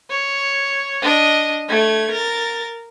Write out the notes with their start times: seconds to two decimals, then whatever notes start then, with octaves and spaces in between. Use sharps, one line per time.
0.10 C#5
1.02 D4 D#5
1.69 A3 G#6
2.11 A#4 A6